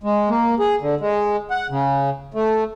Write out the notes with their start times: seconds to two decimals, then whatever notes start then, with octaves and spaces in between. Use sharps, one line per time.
0.03 G#3
0.29 A#3
0.60 G#4
0.81 D3
1.00 G#3
1.51 F#5
1.70 C#3
2.34 A3